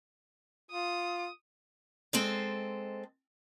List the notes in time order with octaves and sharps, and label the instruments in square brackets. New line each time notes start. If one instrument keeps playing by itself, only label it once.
[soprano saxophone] F4 [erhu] D#6
[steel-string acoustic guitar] G#3 C4 A4 D#5